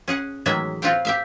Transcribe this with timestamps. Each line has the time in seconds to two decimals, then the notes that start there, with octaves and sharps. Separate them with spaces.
0.08 C#4 G#4 F#5
0.46 A2 D#3 E3 F#3 G#3 E5
0.82 C4 F4 B4 C#5 F5 G5
1.05 G4 E5 F5